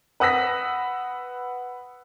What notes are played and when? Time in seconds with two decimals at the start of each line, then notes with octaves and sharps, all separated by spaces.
0.20 B4 F#5 D#6 E6 A#6 B6